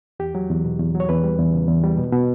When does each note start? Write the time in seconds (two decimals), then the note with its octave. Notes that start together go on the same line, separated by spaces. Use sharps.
0.20 E2 G4
0.35 F#3
0.50 E2
0.65 B2
0.80 E2
0.94 F#3
1.00 C#5
1.09 E2 B4
1.24 G3
1.38 E2
1.54 C#3
1.68 E2
1.84 G3
1.98 B2
2.13 B2